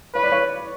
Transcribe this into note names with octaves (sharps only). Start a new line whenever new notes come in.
B4 C#5
D5
C#5